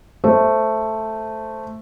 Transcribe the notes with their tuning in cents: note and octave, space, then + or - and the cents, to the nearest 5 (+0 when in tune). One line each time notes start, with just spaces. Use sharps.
A3 +0 C5 +0